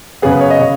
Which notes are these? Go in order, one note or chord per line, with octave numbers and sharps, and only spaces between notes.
F#2 C#3 B3 G#4
B4
C#5
D#5
C#3 C#5